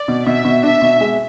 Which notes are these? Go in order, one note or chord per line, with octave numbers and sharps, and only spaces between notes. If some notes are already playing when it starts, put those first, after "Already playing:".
Already playing: D5
B2
B2 E5
B2
D4 E5
B2
G#3